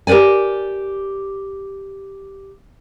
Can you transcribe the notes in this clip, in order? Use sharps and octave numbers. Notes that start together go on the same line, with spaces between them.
G4 A#4 B4 D5 G#5